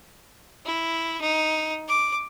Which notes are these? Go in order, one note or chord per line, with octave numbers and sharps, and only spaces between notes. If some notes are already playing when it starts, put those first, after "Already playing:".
E4
D#4
D6